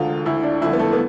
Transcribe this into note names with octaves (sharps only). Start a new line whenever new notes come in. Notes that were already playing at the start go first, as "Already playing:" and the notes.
Already playing: E1 D2 D3 F4
D2 D3 E4
D4
G1 F2 D3 E4
B3
A3
B3